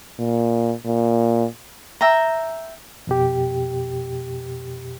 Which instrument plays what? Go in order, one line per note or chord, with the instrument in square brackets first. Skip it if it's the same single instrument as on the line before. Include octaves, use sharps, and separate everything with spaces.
[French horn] A#2
A#2
[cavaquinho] E5 G5 A#5
[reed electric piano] F2 B2 G4